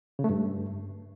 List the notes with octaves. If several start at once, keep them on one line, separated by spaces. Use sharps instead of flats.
C#3
A3
G2